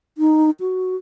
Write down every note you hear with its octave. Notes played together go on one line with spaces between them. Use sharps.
D#4
F#4